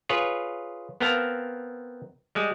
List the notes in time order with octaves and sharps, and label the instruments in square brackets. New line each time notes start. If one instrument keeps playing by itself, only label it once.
[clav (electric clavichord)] F4 G#4 B4 C#5
B3 C4 A#4 F5 A5 A#5
G3 G#3